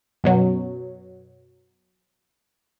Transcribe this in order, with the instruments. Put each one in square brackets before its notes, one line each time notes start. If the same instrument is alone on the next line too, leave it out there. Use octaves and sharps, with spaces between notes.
[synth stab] F#2 B2 F#3